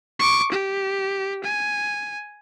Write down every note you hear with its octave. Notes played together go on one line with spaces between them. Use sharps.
C#6 D6
G4
G#5